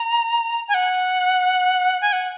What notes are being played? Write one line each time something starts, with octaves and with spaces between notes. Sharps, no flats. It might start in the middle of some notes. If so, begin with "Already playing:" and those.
Already playing: A#5
G#5
F#5
G#5
F#5